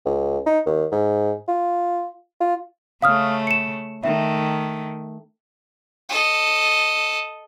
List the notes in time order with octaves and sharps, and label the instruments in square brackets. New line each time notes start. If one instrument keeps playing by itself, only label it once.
[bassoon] C#2
D#4
D#2
G#2
F4
F4
[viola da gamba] C#3 A3 [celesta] F5 D#6 F6
[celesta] C#7 E7
[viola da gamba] D#3 A3 [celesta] E5
[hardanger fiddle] A4 D#5